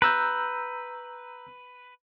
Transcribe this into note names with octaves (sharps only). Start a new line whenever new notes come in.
B4 A#5 E6 G6